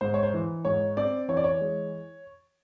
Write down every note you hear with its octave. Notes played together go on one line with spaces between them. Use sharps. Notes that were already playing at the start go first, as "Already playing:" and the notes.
G#2 C5
C#5
C5
E3
G#2 C#5
C4 D5
E3 C#5
D5
C#5
G#3